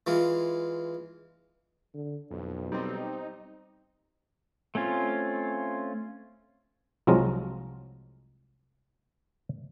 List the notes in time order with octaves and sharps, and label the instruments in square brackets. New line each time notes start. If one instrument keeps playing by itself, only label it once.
[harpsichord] E3 G#3 F4
[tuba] D3
[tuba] B1 [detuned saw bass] F2
[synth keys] G3 C4 [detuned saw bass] D#4
[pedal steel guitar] A3 C4 C#4 F4
[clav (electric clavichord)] C2 F3 F#3 G#3 F4 A#5